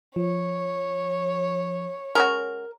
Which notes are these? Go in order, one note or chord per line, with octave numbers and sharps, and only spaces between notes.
F3 C#5
G#3 C#4 F#4 A#4